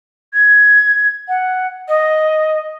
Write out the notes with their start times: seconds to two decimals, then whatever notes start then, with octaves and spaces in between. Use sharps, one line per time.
0.33 G#6
1.28 F#5
1.88 D#5